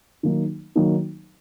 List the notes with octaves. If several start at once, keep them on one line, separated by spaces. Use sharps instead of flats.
D#3 F#3 A#3 D#4
D#3 F#3 A#3 D#4